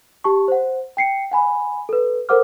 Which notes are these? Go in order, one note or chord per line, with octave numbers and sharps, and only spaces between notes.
G4 A5 C#6
C5 F#5
G5 C7 C#7
F#5 G#5 B5
A4 B4
A4 A#4 C5 F#5 D6 F6